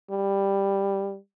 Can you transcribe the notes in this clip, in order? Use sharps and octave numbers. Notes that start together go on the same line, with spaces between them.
G3